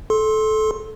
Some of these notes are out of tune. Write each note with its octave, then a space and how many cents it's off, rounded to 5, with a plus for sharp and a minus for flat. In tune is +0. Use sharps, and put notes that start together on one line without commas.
A4 -20 C6 +15